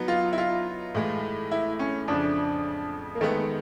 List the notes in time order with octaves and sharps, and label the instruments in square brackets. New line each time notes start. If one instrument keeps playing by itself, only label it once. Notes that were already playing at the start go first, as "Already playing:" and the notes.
Already playing: [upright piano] F#3 B3 D#4
[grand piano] F4
E4
F4
[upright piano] A2 E3 G#3
[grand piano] E4
C#4
[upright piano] F2 C#3 F3 [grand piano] D4
[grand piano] A#3
[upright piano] D#3 G#3 B3 [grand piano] A3